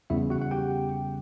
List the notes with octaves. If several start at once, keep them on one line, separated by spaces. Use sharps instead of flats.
E2 C#3 G3 B3 E4 E5
F#4 F#5
F#5
G4 G5